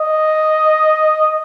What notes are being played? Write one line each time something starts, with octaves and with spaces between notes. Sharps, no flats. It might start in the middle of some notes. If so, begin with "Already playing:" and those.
Already playing: D#5